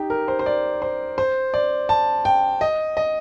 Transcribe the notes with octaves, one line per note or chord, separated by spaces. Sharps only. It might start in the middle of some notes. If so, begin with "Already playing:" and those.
Already playing: D#4 G4
A#4
C5
C5
D5
C5
C5
D5
A5
G5
D#5
D#5